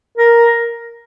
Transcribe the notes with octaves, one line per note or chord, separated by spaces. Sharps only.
A#4